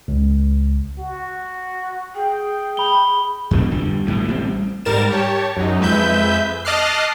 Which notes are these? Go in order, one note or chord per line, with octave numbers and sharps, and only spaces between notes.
C#2
F#4
G#4 G5
B5 G7
F2 B2 D3 D#3
G2 D3 G3
D2 A2 E3
A1 G3 C4
G#2 G3 A#4 A6 E7
G4 C#5 A5
F#2 F#3 D#4
F2 G#3 B4 E5 G6
D#5 A5 D6 F6 F#6 C7